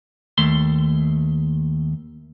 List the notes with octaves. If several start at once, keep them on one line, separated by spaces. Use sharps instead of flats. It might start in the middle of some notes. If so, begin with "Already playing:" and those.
D#2 A3 C6